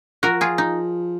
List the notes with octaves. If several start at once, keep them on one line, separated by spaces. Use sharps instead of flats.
F3 F#4 A#4
F4 G#4
D#4